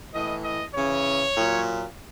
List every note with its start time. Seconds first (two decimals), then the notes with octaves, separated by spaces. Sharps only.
0.14 A2 E3 D#5
0.43 D#5
0.74 C#3 E3 C#5
1.35 A#2 F#3